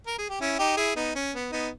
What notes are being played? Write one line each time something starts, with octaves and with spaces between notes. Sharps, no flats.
A#4
G#4
G4
C#4 E4
D#4 G4
E4 G#4
B3 D#4
C#4
B3
B3 D#4